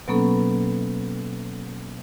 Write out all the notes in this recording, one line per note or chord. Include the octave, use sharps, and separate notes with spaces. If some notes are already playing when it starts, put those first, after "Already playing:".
B2 F#3 A#3 B3 C#4 A4